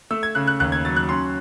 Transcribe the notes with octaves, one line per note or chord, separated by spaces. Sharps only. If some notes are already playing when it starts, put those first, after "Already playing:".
A3 E6
G#6
C#3 F#6
F#6
D#2 F#6
G#6
F#3 A6
F#6
C#4 C6